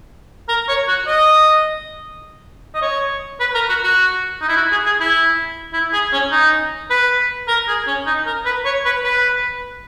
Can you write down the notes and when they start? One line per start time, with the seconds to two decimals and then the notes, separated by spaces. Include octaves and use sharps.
0.49 A#4
0.68 C#5
0.88 F#4
1.07 D#5
2.75 D#5
2.82 C#5
3.40 B4
3.55 A#4
3.69 F#4
3.84 F#4
4.41 D#4
4.48 E4
4.57 F#4
4.72 G#4
4.86 G#4
5.00 E4
5.73 E4
5.93 G#4
6.12 C#4
6.32 D#4
6.90 B4
7.48 A#4
7.68 G#4
7.87 C#4
8.07 D#4
8.26 A#4
8.45 B4
8.65 C#5
8.85 B4
9.04 B4